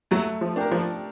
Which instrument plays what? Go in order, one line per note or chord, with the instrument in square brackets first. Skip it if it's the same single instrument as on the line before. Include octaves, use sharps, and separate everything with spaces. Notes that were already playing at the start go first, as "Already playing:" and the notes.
[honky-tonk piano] F#3 [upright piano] A3
[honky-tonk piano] F3
[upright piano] D4 G4 A#4
[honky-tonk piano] F3